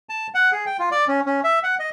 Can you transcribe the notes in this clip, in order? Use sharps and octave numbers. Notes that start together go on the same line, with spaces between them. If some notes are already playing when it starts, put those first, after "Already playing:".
A5
F#5
G#4
G5
F4
D5
C#4
C#4
E5
F#5
D#5